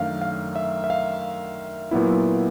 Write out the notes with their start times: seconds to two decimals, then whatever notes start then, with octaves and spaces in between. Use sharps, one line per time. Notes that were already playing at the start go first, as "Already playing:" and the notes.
Already playing: F#2 D#3 F#3 A3 D4 F5
0.22 F5
0.56 E5
0.84 E5
0.90 F5
1.91 A#2 F#3 B3 E4